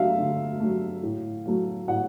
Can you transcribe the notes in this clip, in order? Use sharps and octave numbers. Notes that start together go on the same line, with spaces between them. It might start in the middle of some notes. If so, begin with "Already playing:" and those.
Already playing: D3 F#3 A3 E5 F5
D3
F#3 A3
A2
F#3 A3
A2 F#5